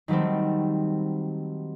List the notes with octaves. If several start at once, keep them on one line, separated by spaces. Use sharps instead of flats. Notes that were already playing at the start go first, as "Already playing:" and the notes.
D#3 F#3 G3 A3 C4